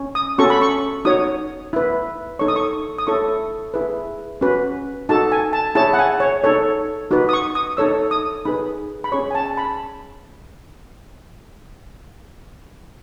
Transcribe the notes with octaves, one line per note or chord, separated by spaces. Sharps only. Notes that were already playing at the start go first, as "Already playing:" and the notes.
Already playing: C#4
D#6
C#4 F#4 A4 C#6
B5
C#6
D#4 F#4 C#5 D#6
E4 B4
D#4 A4 C#5 C#6
D#6
C#6
D#6
E4 A4 C#5 C#6
E4 G#4 B4
C#4 F#4 B4
D#4 F#4 A4 A5
G#5
A5
E4 G#4 C#5 A5
F#5
G#5
C#5
D#4 A4 C#5
D#4 F#4 B4
D#6
C#6
D#6
D#4 A4 C#5 E6
D#6
D#4 G#4 B4 B5
B5
C#4 G#4 C#5 C#6
G#5
A5
A5
B5